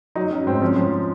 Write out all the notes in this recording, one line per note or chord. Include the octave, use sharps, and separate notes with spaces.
F#3 D#4
F#3 C#4
G#2 C4
F3 C#4
F3